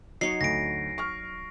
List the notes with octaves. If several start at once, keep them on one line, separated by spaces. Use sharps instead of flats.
F#3 D#4 C#5 D#5 C7
D2 A#6 D7
C#6 F6